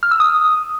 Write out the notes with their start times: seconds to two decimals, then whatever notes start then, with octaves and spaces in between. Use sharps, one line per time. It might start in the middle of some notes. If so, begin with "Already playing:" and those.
0.03 F6
0.11 E6
0.20 D#6